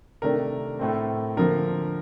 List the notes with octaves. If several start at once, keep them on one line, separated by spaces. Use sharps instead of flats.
C3 D#3 A3 D4 A#4
A2 A3 C4
D3 F3 A#3 A#4